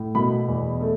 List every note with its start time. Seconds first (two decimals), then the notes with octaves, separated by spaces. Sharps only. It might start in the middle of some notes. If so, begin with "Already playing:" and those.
Already playing: A2
0.15 B2 B5
0.48 E2
0.81 A3